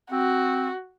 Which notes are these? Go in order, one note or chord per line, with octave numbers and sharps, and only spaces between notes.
C4 F#4